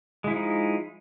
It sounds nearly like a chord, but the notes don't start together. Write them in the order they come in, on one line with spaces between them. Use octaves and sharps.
G#3 E4 F3 D#4